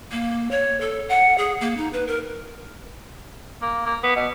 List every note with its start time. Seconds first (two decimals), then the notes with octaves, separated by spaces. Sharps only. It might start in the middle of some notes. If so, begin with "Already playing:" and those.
0.12 A#3
0.51 C#5
0.81 A4
1.09 F#5
1.38 G#4
1.61 A#3
1.77 D#4
1.93 B4
2.07 A#4
3.62 A#3
3.86 A#3
4.03 B3
4.16 B2